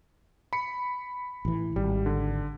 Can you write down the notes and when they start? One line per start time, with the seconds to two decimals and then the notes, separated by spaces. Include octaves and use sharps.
0.53 B5 C#7
1.45 A1 E3
1.76 G#1 G3
2.06 D3